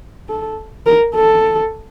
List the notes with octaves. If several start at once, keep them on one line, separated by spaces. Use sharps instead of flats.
A4
A#4
A4